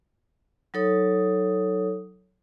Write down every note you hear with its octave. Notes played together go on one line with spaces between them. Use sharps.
F#3 D#4 A4 C#5 D#6